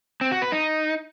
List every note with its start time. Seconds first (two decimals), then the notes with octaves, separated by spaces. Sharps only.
0.21 C4
0.31 F#4
0.42 B4
0.52 D#4